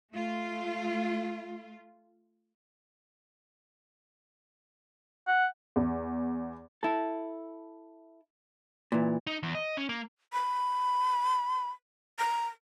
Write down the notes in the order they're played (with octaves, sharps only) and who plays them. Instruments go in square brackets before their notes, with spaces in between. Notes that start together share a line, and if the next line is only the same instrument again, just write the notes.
[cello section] A3 F4
[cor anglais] F#5
[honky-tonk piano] E2
[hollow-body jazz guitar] E4 A4
A#2 E3
[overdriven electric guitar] D#4
E2
D#5
C#4
A#3
[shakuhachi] B5
A#5